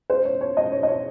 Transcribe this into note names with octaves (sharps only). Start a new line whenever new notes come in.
C5
C#5
C#5
D#5
C#5
D#5
C#5